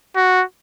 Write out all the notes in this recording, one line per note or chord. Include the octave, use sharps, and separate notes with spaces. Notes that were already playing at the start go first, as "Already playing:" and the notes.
F#4